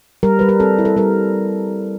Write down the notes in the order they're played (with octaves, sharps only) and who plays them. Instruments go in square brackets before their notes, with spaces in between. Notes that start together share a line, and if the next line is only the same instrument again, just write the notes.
[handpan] G3 A#4
G3 B4
A#4
C4 A4
E4
A4
G3 A#4